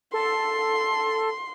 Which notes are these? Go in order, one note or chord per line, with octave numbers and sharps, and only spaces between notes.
A4 C6